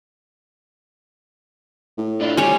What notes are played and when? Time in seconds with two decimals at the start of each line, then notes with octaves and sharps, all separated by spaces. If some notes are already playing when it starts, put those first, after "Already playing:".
1.98 A2
2.20 D4 E4 F4
2.37 G3 G4 C5 C#5 G#5